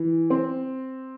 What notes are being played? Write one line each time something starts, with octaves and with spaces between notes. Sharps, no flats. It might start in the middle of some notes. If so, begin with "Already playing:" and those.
Already playing: E3
C4